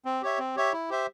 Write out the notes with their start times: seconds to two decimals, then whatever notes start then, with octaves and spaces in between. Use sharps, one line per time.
0.05 C4
0.22 G4 C#5 E5
0.39 C4
0.56 G4 C#5 E5
0.73 E4
0.90 G4 C5 E5